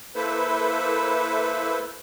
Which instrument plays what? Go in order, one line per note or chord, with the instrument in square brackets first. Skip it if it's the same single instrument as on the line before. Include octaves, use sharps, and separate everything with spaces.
[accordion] A#3 E4 A4 B4 C5 E5